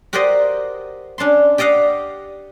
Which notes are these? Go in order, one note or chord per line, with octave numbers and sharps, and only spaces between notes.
F#4 G4 A#4 C5 D5 D#5
C#4 D4 A5 C6
G4 D5 D#5 F5 F#5